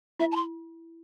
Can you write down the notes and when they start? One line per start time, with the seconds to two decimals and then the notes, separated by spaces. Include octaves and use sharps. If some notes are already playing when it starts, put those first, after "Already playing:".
0.20 E4 E5
0.32 A5
0.36 C6